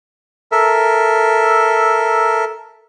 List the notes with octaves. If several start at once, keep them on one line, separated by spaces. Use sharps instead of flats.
A4 A#4 E5